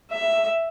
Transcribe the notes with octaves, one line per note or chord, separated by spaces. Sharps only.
E5